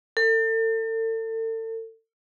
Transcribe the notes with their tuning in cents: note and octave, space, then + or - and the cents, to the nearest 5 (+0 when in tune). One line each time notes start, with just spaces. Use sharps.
A4 +35